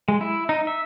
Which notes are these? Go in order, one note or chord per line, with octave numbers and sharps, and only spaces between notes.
G#3
E4
D#4
E5